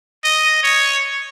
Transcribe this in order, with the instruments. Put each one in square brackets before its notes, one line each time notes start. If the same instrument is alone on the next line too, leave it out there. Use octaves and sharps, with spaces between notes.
[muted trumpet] D#5
C#5